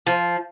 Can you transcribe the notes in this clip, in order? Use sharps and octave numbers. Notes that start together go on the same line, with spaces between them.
F3